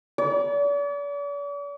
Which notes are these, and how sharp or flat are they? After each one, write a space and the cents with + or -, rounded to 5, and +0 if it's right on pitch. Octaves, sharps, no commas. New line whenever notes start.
D5 -45